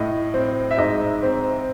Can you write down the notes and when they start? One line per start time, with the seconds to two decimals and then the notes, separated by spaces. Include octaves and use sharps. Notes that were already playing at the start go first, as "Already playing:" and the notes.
Already playing: A2 D#5
0.34 C4
0.71 E5
0.77 G#2 D#5
1.23 C4